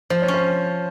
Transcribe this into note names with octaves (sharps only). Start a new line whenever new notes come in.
F3 C5
C#5
C#4
C5